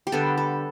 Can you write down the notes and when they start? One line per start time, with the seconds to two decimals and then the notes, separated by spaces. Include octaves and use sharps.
0.07 G4
0.12 D3 G3 B3 D4 A4
0.38 A4